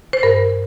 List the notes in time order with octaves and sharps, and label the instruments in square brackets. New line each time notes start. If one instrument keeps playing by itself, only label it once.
[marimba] C5
G2 A#4